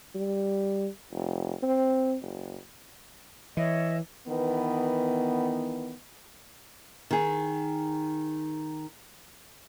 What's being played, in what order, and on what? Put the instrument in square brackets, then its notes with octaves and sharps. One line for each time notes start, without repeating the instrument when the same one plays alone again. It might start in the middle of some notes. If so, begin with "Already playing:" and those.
[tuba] G3
F1
C4
F#1
[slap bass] E3 [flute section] C#5 D#5 E5
[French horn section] D#3 E3 B3
[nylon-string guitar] D#3 G#4